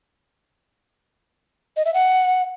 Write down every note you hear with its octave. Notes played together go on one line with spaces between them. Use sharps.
D#5
E5
F#5